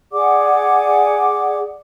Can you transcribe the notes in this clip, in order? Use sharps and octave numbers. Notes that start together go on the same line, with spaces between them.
G#4 D5 F#5 D6